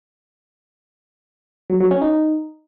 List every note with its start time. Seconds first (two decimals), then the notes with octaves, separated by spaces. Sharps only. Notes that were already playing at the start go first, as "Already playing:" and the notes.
1.70 F#3
1.80 F#3
1.91 C#4
2.02 D#4